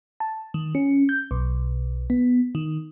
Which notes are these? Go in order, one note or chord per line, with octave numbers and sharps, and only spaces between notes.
A5
D#3
C#4
G6
B1
B3
D#3